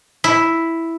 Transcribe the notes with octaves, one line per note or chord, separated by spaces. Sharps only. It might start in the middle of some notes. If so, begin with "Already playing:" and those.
E4